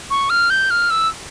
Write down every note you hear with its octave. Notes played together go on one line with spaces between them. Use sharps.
C#6
F6
G6
F6
E6